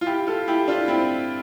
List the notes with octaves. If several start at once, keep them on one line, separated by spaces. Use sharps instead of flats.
F4
E4 G4
F4 A4
E4 G4
D4 F4
C4 E4